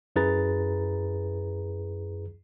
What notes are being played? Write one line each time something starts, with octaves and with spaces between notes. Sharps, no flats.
F#2 E4 G#4 B4 A#5 A6